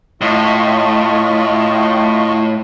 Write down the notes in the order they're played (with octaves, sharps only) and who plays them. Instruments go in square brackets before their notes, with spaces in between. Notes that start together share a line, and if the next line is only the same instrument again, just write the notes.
[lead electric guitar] A2 [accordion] F4 D#5 C#6